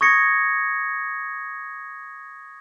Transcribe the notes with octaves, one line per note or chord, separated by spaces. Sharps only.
C#6 D#6 G#6 A#6 C#7